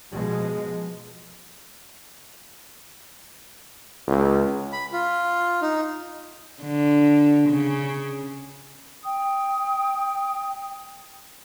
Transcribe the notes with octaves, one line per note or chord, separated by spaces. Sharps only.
B2 F3 G#3
C#2
B5
F4
D#4
D3
C#3
G5 D#6